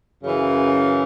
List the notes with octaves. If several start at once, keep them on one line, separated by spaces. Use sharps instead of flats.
F#2 C#3 E3